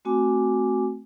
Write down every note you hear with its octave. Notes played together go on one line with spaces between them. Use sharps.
A3 C4 F#4 G#5 D6